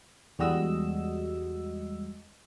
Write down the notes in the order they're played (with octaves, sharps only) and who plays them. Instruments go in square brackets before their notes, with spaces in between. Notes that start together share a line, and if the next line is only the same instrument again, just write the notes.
[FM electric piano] E2 G3 G#3 F#4 D#5 E6